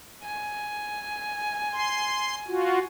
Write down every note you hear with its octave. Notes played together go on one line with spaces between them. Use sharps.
G#5
C6
F4 F#4